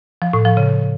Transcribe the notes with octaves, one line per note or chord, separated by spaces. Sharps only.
F3
A2
F3
C#3